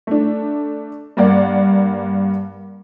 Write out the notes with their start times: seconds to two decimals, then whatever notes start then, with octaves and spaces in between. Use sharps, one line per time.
0.07 A3 D4
1.17 G2 A#3 D5 F#5